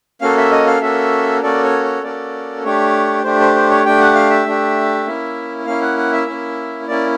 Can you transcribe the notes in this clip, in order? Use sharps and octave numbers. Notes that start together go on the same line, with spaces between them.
A#3 C#4 F#4 A4 F5
E5
D#5
F5
A#3 C#4 F#4 A4 E5
A#3 C#4 F#4 A4 D5
C#5
C#5
A#3 C#4 F#4 A4 D5
A3 D4 G4 C#5
A3 D4 G4 C5
C5
C5
C#5
A3 D4 G4 G5
F#5
F5
E5
A3 D4 G4
A#3 C#4 E4
A#3 C#4 E4 F5
F#5
F#5
E5
A#3 C#4 E4
A#3 C#4 E4 D5